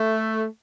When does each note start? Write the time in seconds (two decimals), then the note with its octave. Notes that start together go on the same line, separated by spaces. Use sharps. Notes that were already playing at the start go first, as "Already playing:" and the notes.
Already playing: A3